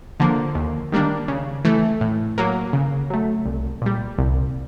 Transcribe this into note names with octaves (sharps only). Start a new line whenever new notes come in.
D3 F3 A#3
D#2
D#3 G3 A#3 D4
C#3
E3 A3
A2
F#3 A#3
C#3
F#3 A3
C2
A#2 G3
C2